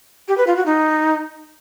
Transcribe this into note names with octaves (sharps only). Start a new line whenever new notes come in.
G4
B4
F4
F#4
D#4